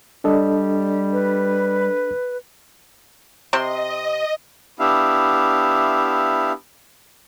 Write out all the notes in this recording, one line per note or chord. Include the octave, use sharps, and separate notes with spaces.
G3 D4 A4 D#5
B4
C3 C4 D#5 C6
B3 D4 E4 G4 E5 F5